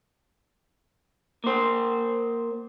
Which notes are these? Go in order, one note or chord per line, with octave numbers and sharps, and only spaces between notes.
A#3 C5